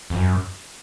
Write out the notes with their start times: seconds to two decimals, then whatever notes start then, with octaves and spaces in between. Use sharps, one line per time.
0.10 F2
0.15 F#2